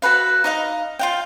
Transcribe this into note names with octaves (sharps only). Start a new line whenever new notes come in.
F#4 A4 B4 F5
D#4 D#5 F5
F4 F5 G5